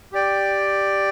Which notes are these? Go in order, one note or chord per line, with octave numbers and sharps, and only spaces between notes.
G4 D5 G5